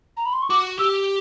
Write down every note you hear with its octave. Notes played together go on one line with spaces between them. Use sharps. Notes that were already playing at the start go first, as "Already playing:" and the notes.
A#5
B5
C6
C#6
F#4 D6
G4 E6